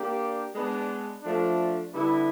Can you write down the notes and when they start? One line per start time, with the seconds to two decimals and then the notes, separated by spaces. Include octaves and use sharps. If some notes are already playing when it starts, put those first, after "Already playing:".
Already playing: A#3 D4 G4
0.55 G#3 B3 D4
1.23 F3 A3 D4
1.93 D3 G3 B3 E4